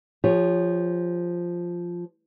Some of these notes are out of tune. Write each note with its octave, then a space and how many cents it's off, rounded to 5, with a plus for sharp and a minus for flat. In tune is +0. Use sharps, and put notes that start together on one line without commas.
F3 +0 G4 +45 C#5 +0